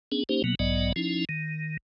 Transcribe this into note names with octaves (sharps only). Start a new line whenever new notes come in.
B3 C#4 D4 G#4
A#3 C#4 D#4 G4 C5
B2 F#3 A#3 B3
B1 G#2 F#3 B3 D5 D#5
F3 C#4 D#4 E4
D#3